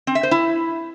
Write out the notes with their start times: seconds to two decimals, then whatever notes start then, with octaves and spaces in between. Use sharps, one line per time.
0.07 C4
0.15 E5
0.23 C5
0.31 E4